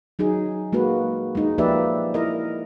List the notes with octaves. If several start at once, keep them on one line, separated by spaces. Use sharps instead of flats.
F#3 D#4 G#4
G#3 A#3 F#4 B4
G#3 D#4
F3 A#3 G4 B4 D5 E5
E4 A#4 D#5